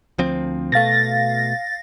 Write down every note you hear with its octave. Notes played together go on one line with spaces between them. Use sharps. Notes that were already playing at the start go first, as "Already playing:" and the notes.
D2 F3 C4
B2 A3 F5 A6 A#6